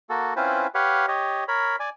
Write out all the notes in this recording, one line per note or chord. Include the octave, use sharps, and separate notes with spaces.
A#3 F#4 A4
C4 C#4 E4 F4 B4 C5
G4 B4 C#5 F5 F#5
G4 C#5 D#5
A#4 C#5 B5
D5 G#5